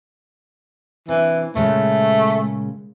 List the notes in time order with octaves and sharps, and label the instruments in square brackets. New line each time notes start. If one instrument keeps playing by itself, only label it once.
[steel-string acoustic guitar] C3 D4 [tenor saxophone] E3
[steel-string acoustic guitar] A#2 C#3 G#3 [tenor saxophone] A3